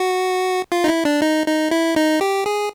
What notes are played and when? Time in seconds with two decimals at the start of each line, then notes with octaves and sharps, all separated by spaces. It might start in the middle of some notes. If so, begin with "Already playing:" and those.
Already playing: F#4
0.72 F4
0.84 D#4
0.88 E4
1.05 D4
1.22 D#4
1.47 D#4
1.71 E4
1.96 D#4
2.21 G4
2.46 G#4